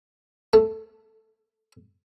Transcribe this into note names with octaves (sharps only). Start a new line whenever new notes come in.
A3